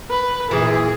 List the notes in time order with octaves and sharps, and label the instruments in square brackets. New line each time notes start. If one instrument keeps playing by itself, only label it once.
[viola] B4
[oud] F#2 A#2 E3 [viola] G#4